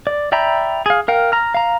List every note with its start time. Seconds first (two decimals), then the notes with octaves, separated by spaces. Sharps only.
0.07 D5
0.32 D5 E5 G5 A#5 B5
0.86 G#4 F5
1.08 A#4 F5 G5
1.32 A#5 F6
1.54 F5 A#5